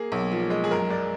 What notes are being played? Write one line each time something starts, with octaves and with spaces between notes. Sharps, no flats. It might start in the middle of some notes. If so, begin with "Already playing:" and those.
Already playing: A#3 G#4
B1
F3
G#3
G#4
F#2 A#4
G#3 D5